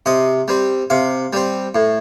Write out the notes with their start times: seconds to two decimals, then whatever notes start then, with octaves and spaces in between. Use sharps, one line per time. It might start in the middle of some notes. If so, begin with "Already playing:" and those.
0.06 C3 D#5
0.48 G3 C4
0.90 C3 F5
1.33 G3 C4
1.75 A2